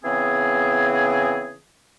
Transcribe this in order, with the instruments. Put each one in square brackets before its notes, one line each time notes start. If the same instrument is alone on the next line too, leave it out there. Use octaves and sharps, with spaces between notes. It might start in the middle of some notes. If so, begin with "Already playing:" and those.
[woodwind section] C#3 E3 B3 C4 G#4